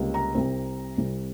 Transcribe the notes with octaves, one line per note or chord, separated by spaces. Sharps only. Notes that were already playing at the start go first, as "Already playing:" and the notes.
Already playing: C#2 C3 G3 A#3
A#5
C2 C3 G3 C4
C2 C3 G3 C4